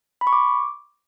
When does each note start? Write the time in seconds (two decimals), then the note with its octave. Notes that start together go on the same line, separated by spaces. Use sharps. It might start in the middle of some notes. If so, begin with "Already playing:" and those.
0.21 B5
0.27 C#6
0.33 D6